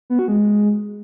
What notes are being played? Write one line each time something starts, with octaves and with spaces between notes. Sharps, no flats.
B3
F#4
G#3